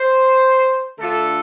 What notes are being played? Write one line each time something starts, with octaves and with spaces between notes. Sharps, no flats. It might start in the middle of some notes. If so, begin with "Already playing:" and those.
Already playing: C5
D3 A3 D4 F4 A4